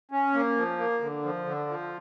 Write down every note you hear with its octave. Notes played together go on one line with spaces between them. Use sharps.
C#4
A#3
F3
A#3
D3
F3
D3
F3